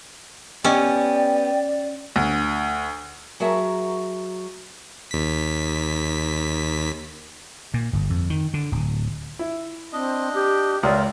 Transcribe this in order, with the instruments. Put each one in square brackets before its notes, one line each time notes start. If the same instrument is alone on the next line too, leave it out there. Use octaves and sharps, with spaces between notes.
[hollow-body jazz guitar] B3 G4 D#5 [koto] C#4 [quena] D5 [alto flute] G5
[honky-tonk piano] D2
[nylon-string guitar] F#3 F#4 G#4 A#4 E5 A5
[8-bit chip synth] D#2 B6
[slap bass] A#2
G1
F2
D#3
D3
D1
[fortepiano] E4
[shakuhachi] C4 [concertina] D4 D#5
[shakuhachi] G4
[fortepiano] C#2 D#6 [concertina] F4 A#4 E5 [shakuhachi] D5